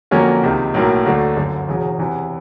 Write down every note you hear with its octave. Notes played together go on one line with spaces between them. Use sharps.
F2 D3 F#3 A#3 C#4
C#2 C3 D#3
B1 A2 F#3 A#3
D2 D3 F#3 A3 D4
G1 F#2 D3
E1 E2 C#3 F#3
E2 C3 E3